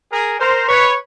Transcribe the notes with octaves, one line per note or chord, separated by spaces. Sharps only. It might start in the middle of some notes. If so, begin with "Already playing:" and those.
G#4 A#4
A#4 C5
B4 C#5